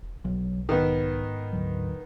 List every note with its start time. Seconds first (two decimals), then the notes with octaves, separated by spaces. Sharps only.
0.03 E1
0.25 B1 F#3
0.69 G#2 D#3 B3
1.53 D2 F#3